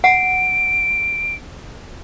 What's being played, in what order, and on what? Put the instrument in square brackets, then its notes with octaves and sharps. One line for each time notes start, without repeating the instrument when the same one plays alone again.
[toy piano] F#5 [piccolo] D7